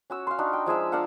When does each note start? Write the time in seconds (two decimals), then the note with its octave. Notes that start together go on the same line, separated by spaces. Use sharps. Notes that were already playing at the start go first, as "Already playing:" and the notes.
0.10 C#4 F#4 E6
0.27 F5 C6
0.38 D4 D#4 F#4
0.53 G5
0.66 F3 G#3 G#4 E5
0.92 D4 A#4 F5 F#5